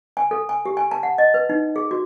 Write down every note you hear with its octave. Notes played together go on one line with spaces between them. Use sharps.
G#5
A4
G#5
G4
G#5
A5
F#5
D#5
B4
D#4
G#4
F#4